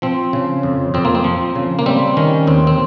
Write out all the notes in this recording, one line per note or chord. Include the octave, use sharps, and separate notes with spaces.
F3 C4
C#3
F2
F2 C4
A#3
C4
F3
C#3
A#3
G3 C4
D#3 C#4
D#2 C4
C4